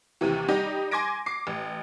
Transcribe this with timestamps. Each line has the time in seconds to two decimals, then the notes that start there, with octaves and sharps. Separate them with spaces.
0.21 D#2 C3 E3
0.48 G3 D#4 G4 D#5
0.91 G#5 C6 D6 G#6 A#6 D7
1.26 D6 C7
1.47 A1